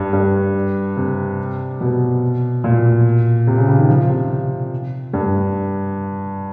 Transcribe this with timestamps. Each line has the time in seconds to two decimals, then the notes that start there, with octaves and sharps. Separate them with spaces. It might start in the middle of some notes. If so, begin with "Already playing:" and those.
Already playing: G2
0.13 G2
0.97 C3
1.81 B2
2.64 A#2
3.47 C3
3.58 C#3
3.68 C#3
3.78 D#3
3.88 F3
4.09 C3
5.13 G2